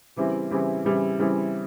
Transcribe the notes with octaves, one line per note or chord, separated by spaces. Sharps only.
C#3 E3 G3 C4 E4
C#3 E3 G3 C4 E4
C#3 E3 G3 C4 E4
C#3 E3 G3 C4 E4